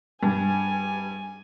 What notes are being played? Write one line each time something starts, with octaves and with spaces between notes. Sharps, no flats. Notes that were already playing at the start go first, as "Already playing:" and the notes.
G2 G#5